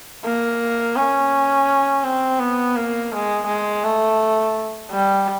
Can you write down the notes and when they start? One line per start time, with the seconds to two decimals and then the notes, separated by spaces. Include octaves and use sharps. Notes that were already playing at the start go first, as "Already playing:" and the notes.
0.25 A#3
0.96 C#4
2.04 C4
2.40 B3
2.76 A#3
3.12 G#3
3.47 G#3
3.84 A3
4.91 G3